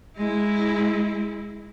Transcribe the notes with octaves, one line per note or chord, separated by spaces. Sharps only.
G#3 E4